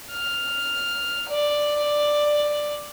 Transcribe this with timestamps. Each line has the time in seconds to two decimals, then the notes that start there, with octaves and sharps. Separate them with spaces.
0.12 F6
1.29 D5